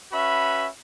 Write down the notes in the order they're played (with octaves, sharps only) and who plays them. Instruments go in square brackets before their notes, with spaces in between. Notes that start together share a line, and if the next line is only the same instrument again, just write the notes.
[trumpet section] C#4 F#4 B4 E5 B5